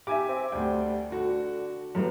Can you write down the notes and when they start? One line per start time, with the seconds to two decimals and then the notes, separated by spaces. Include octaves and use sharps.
0.07 G4 E5 G#5 D6
0.28 C4
0.52 D2 G3 G5
1.12 D3 F#4
1.95 F#2 A2 G3 B3